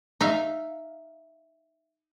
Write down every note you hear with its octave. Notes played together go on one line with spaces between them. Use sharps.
D#4 E5 F5